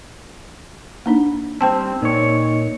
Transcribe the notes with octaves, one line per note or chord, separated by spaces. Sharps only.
A#3 D4 D#4
G3 C4 C5 G5 A5
A#2 D#4 C#5